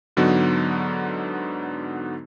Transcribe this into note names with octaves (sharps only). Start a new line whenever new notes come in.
G#2 D3 F#3 B3 D#4 F#4